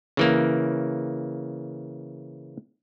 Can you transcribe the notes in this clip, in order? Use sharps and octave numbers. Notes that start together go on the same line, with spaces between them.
C#3 E3 A#3